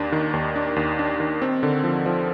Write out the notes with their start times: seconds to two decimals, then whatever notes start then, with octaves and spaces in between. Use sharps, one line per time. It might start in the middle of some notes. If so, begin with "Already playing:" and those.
Already playing: D#2 D4
0.12 D#3
0.33 D#2
0.56 D4
0.76 D#2
0.99 D4
1.20 D#3
1.42 C4
1.63 D3
1.84 F3
2.06 F3